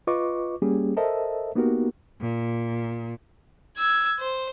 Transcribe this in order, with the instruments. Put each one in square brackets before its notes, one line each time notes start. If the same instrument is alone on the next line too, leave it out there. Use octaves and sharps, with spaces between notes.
[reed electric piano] F4 B4 D#5 C#6 D6
G3 A#3 C#4 G4 G#4
A4 A#4 C5 D#5 E5 A5
A#3 B3 D#4 F#4 G4 A#4
[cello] A#2
[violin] E6 G#6
C5